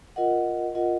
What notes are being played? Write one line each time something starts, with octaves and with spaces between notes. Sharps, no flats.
F4 A#4 D#5 F#5
F4 A#4 D#5 F#5